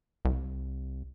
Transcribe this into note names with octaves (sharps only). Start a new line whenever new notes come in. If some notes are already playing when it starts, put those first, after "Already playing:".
C2